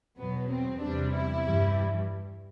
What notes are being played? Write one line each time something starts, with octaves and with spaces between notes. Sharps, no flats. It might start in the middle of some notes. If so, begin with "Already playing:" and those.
E2 B2 F#3 B3
C4
E2 C3 E3 G3 D4
E4
G2 E3 G3